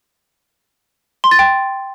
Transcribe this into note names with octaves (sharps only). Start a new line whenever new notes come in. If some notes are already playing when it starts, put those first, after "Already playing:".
C6
A6
G5